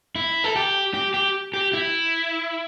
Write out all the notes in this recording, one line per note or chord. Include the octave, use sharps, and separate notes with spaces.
E4
A4
G4
G4
G4
G4
E4